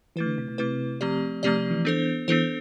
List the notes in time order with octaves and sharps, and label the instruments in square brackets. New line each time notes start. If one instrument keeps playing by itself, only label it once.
[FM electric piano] E3 [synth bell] A3 E4 B4
[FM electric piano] D3
C3
B2
[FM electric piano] C3 [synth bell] A3 E4 B4
[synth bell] F3 A3 C4 G4 D5
[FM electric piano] C3 [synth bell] F3 A3 C4 G4 D5
[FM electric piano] C3
E3
[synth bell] B3 D4 A4 C5
[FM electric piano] E3 [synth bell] B3 D4 A4 C5